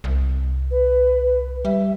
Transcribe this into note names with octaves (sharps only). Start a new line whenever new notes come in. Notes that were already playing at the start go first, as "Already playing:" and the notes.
C2
B4
G3 E5